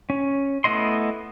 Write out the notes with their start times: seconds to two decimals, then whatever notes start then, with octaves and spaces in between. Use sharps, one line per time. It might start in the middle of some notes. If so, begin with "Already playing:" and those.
0.10 C#4
0.64 A3 B3 E4 D#5 C6